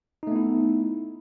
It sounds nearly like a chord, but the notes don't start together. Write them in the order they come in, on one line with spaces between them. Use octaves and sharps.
D#4 A3 B3 E4